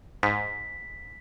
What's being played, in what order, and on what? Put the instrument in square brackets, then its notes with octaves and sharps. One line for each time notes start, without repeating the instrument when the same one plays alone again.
[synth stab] G#2 [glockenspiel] B6